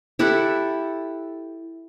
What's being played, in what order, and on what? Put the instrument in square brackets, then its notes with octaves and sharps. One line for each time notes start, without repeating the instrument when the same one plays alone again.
[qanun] E4 G4 A4 F#5